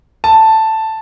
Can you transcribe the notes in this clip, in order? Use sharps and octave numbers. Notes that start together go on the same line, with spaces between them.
A5